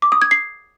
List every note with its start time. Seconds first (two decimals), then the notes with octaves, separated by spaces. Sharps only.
0.02 D6
0.12 D#6
0.22 G#6
0.31 C7